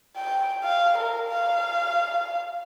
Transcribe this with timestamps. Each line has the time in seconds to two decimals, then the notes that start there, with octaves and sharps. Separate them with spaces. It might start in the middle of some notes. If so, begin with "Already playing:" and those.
0.17 G5
0.64 F5
0.98 A#4
1.29 F5